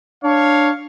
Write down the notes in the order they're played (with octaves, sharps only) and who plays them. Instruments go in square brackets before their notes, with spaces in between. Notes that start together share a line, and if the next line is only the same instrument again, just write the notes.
[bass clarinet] D4 [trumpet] C#5 [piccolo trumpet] F5